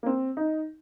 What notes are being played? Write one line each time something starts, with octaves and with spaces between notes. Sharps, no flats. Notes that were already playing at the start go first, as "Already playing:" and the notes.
A#3
C4
D#4